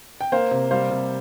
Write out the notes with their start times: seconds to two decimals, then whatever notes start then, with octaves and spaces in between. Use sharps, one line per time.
0.21 G5
0.32 A#3 C5 F5
0.51 C3
0.71 G3 C5 F5
0.90 C3